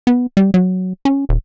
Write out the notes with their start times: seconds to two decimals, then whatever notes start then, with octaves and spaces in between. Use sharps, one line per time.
0.07 B3
0.37 G3
0.54 F#3
1.05 C#4
1.29 D#1